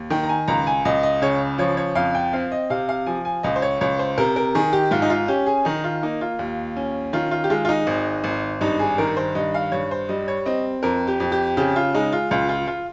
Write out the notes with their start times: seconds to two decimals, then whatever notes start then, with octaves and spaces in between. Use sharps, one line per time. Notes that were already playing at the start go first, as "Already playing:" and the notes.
Already playing: D#2
0.10 D#3 G5
0.23 A#5
0.29 G#5
0.48 C#2 A#5
0.67 G#5
0.85 C#2 D#5
1.03 D#5
1.22 C#3 C#5
1.58 F3 C#5
1.77 C#5
1.95 F2 F5
2.15 G5
2.33 C4 F5
2.52 D#5
2.70 C3 F5
2.89 F5
3.06 F3 G#5
3.25 G#5
3.43 C#2 D#5
3.56 C5
3.62 C#5
3.81 C#2 C#5
3.99 C5
4.18 C3 A#4
4.36 A#4
4.55 D#3 G#4
4.73 G4
4.91 G#2 F4
5.02 D#4
5.10 F4
5.28 C#4 G4
5.46 G#4
5.65 D#3 D#4
5.84 F4
6.03 A#3 D#4
6.21 F4
6.39 D#2
6.77 C#4
7.13 D#3 F4
7.31 F4
7.44 G4
7.50 G#3 F4
7.65 F4
7.69 D#4
7.87 G#1
8.24 G#1
8.61 G2 D#4
8.79 G#4
8.98 D#3 A#4
9.17 C5
9.35 G2 D#5
9.54 F5
9.72 G2 C#5
9.91 C5
10.09 G3 D#5
10.28 C#5
10.46 C4 D#5
10.83 F2 A#4
11.07 G4
11.20 F2
11.32 G4
11.57 C#3 G4
11.76 F4
11.94 G#3 D#4
12.12 F4
12.31 C#2 F4
12.49 F4
12.67 F4